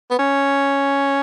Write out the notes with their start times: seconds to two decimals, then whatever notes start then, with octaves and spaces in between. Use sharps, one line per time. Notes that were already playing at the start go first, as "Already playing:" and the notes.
0.10 B3
0.19 C#4